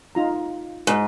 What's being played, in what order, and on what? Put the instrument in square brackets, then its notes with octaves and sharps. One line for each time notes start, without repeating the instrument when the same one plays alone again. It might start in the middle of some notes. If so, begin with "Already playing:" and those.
[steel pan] D#4 F4 A#5
[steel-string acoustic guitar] G#2